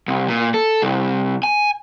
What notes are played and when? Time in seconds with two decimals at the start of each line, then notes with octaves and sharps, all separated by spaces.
0.08 C2
0.28 A#2
0.54 A4
0.82 C2
1.43 G#5